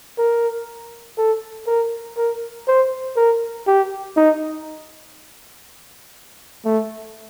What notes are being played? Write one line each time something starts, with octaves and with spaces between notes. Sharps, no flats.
A#4
A4
A#4
A#4
C5
A#4
G4
D#4
A3